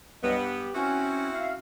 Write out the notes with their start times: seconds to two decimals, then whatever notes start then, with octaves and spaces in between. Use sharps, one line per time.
0.23 C2 G2 F#3 B3 D#5
0.41 G4
0.75 C4 C#4 E4 F#4
1.33 E5 F5